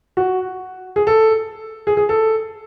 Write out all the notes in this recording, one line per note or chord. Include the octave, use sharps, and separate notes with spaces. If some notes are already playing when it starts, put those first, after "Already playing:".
F#4
G#4
A4
G#4
G#4
A4